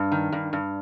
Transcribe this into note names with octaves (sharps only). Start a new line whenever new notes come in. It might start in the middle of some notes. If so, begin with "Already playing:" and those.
Already playing: G2
D#3
G2
G2